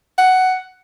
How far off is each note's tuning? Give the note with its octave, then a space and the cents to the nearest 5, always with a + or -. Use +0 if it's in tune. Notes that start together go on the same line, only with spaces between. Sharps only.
F#5 +10